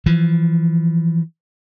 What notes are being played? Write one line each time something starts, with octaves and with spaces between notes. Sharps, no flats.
E3 F3